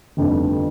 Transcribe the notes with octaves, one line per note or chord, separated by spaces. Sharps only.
G1 F2 D3 A3 D#4